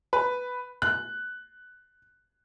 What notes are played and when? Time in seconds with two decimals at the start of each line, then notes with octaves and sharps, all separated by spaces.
0.13 B4
0.82 F#6